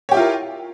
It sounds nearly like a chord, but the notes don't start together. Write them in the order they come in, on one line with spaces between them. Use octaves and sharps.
C#5 G4 E4 F4 A#4